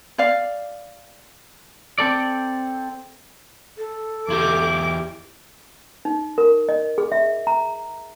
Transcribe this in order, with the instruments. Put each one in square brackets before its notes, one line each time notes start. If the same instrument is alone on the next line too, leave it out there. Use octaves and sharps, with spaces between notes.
[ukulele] D5 F5
[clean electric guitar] C4 A4 D5
[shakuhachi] A4
[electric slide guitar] E2 E4 G4 [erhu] D6
[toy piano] D#4
A#4
D#5
G#4
E5
A#5